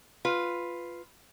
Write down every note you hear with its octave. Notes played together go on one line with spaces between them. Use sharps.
F4 B4